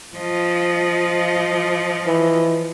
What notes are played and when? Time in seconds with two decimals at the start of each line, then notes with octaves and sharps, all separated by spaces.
0.17 F3 F4 D#5
2.07 E3